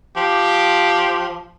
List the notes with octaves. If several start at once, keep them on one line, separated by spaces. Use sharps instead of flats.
F3 G4